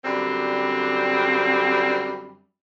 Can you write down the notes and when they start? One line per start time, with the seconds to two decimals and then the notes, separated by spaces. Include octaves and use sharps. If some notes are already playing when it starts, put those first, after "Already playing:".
0.04 F#2 D3 G3 C4